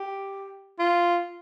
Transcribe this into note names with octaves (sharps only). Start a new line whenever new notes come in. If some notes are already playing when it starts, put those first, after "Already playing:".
Already playing: G4
F4